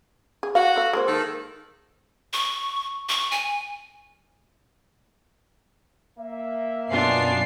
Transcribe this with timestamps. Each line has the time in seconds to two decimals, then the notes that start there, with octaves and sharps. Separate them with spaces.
0.43 G#4
0.55 F#4 F5
0.76 A3 F5
0.93 G#3 A#3 C5
1.07 D#3 A4
2.33 C#6
3.09 C#6
3.32 G#5
6.19 A#3 E5
6.91 F#2 B2 D4 F4 G#5 C7